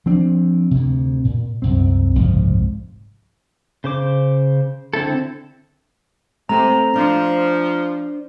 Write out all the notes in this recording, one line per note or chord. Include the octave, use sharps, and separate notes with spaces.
F3 C4 D4
D2 C3
A#2
C2 F#2 C4
F#1 C2 G#2 F3
C#3 C5 D6
D3 C4 E4 A4
C3 A3 C4 A#5
F3 D4 C5